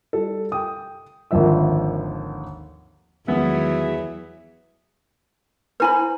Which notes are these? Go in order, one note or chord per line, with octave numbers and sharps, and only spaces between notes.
G3 A4
G5 D#6
G#1 D#2 D3 F3 E5 E6
E2 D#3 F3 F#3 G#3 B3 G#4 E5
E4 B4 C5 G#5 B5